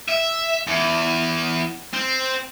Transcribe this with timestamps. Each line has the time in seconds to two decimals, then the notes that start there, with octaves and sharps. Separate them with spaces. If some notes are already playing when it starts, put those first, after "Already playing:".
0.08 E5
0.68 E2
1.94 C4